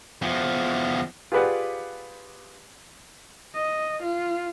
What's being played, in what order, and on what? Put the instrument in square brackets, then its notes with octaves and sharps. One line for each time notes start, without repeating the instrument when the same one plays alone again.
[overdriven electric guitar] E2 F3
[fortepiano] F4 G4 G#4 B4 D5 F#5
[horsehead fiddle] D#5
F4